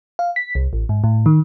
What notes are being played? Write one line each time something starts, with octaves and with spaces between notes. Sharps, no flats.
F5
B6
C2
A1
G#2
A2
D#3